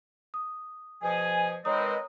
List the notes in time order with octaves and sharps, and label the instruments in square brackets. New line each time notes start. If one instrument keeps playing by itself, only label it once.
[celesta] D#6
[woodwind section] B2 F3 G#4 [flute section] G#5
[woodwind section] D#3 G#3 C4 [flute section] B4 D#5 [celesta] C#5 A#5 D#6